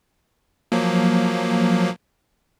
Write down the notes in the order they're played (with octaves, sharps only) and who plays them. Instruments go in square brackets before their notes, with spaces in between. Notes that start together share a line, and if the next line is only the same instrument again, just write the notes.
[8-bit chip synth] F3 F#3 A#3